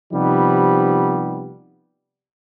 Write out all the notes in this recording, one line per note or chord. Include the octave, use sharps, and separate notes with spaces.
C3 F3 G3 B3 D#4